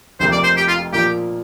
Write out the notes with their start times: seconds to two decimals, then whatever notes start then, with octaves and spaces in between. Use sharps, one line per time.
0.20 F1 F2 C3 A#3 C5
0.32 D5
0.44 C5
0.57 G4
0.68 F4
0.93 A#2 F3 A#3 G4